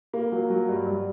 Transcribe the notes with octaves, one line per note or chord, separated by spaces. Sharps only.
A#3
F#3
F#3
G2
G2